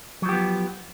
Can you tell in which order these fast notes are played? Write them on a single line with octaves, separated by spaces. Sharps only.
F#3 F3 G4 B3